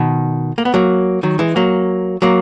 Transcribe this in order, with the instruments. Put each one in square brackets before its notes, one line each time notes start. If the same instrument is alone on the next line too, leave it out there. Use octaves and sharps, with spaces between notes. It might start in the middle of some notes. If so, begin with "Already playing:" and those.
Already playing: [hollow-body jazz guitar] B2 D#3
A#3
B3
F#3 A#3
D#3 F#3
E3 G#3
F#3 A#3
F#3 A#3